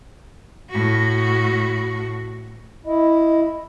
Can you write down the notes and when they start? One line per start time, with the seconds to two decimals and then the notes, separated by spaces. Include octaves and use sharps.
0.70 A2 F#4
2.85 E4 D#5